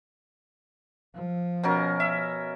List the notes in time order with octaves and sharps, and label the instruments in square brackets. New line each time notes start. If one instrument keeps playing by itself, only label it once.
[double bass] F3
[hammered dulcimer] B2 C#4 A#4
E5